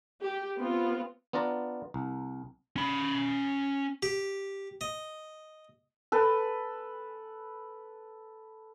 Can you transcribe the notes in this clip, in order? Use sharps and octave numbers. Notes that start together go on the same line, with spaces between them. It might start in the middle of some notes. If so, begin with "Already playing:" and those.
G4
B3 C4 F4
B3 D4 F4 D5 A#5
C2
C#4 B5
G4
D#5
A4 B4